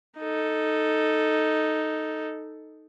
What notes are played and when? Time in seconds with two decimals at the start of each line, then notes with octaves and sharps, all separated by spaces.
0.19 D#4 A4